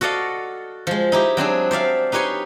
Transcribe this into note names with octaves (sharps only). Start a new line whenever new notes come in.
F#4 A4 D5 D#5 F5
F3 G#3
D#4 E4 G4
F#3 C4 D4 G#4
C5 D5 E5 F5
D#4 G4 B4 C#5 G#5 C6